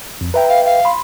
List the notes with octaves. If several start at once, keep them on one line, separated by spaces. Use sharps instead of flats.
F2
B4 E5 G5 A#5
F5
F5
B5 C6